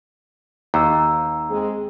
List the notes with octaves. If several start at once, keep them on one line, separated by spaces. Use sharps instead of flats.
D#2 A#5 E6
G#3 C4 G#4